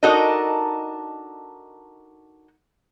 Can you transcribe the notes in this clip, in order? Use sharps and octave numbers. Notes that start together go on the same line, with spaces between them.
D4 D#4 F#4 A4 A#4 D#5